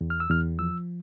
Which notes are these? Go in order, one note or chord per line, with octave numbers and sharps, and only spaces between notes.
E2
F6
E6
E2 F6
F3 E6